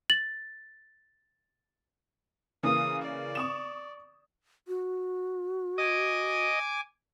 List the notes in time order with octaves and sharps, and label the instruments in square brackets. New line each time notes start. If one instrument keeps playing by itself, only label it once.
[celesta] A6 [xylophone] F#7
[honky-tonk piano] C#3 E3 A#3 [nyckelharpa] D#6
[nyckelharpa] D5
[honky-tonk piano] C#6 D#6 E7
[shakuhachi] F#4
[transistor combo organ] D#5 [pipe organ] G#5 D6